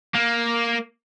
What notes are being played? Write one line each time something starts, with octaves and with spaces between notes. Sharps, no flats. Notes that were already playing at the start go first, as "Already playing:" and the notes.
A#3